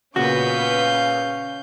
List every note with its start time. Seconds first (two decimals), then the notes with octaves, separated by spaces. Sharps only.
0.16 A#2 C#3 B3 C#4 F#4 B4 F5 G6